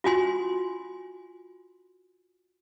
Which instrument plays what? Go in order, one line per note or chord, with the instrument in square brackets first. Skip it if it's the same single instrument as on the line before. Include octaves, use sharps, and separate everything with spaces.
[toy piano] F4 F#4 G#5 C6